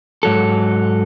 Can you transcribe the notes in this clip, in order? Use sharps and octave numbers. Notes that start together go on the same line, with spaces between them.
G#2 F#3 A4